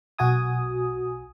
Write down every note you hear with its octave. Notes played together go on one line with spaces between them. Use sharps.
B1 F#4 G#5 D#6